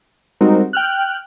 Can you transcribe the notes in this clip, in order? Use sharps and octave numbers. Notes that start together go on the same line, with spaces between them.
G3 G#3 C4 D#4 F#4 A#4
G5 F6 F#6